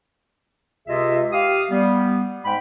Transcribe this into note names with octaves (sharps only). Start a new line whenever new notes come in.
C#2 C3 F4 G#4 D#5 E5
G4 F5 D#6
G3 B3
G#2 G#3 G5 B5